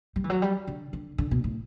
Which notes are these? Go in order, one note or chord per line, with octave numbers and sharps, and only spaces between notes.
G3
E3
F#3
G3
D3
D3
D3
B2
A2